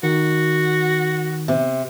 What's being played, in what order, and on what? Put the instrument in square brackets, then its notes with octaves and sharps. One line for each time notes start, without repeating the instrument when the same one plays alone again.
[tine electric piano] D#3 [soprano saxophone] F#4
[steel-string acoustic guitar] C3